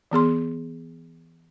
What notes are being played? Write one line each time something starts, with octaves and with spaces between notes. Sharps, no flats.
E3 B3 G#4 C6